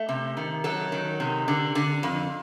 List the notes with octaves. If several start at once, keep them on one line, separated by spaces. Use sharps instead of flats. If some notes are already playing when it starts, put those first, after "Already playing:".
Already playing: A3
C3
D#3
F#3 A4
D#3
C3
D3
D3
F2